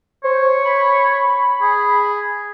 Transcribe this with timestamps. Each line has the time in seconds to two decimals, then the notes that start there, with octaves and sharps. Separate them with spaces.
0.24 C5 C#5
0.65 B5
1.62 G#4